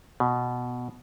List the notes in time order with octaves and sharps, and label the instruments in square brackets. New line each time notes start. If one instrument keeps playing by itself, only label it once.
[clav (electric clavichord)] B2